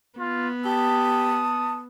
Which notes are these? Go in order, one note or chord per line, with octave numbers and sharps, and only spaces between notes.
B3 F4
G4 A5 D#6